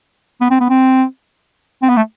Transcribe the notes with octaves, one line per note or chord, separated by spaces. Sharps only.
B3
C4
B3
C4
C4
B3
A3